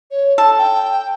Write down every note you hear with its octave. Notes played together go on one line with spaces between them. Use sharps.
C#5
A4 A5
G5